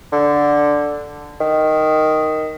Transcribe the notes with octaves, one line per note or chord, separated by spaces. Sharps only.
D3
D#3